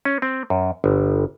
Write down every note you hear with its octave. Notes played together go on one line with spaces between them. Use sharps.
C#4
C4
F#2
G1